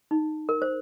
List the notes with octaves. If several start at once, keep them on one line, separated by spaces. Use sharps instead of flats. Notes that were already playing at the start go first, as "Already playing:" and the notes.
D#4
A#4
C5